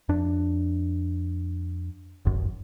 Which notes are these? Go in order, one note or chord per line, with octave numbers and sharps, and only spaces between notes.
F2 D4
D#1 G#1 F#2